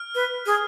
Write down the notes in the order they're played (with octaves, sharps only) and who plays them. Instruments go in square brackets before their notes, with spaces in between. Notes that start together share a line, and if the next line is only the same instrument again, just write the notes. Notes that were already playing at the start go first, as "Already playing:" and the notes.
Already playing: [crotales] F6
[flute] B4
G#4